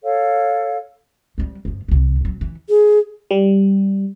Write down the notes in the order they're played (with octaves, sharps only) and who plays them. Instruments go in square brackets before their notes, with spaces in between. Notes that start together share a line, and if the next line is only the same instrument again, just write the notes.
[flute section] A4 C#5 F5
[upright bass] F3 G3
G2 F3
C2 E3
A#2 F#3
E3
[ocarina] G#4
[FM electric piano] G3